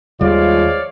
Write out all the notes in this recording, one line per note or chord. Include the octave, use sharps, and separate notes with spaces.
D#2 F3 G3 G#3 F4 C#5 D5 F5